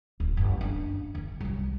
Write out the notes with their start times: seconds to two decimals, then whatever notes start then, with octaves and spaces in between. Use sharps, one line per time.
0.20 D1
0.37 F#1
0.61 C#4 D4
1.15 D3 D#3
1.41 C2 F#3